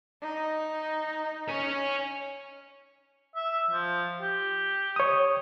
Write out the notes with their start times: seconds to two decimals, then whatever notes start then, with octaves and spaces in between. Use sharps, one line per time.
0.21 D#4
1.49 C#5 G#5
3.36 E5
3.70 F3
4.21 G4
4.96 C#5 D#6